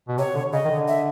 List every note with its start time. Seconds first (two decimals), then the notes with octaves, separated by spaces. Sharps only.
0.08 B2
0.17 C3 C#5
0.35 D3
0.53 C#3 D#5
0.65 D#3
0.71 D3
0.88 E5